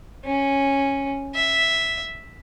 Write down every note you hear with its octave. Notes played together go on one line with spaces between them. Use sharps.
C#4
E5